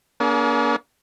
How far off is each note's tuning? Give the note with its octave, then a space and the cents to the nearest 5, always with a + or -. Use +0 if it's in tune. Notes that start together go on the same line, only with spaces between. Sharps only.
A#3 +30 D4 -45 G#4 +40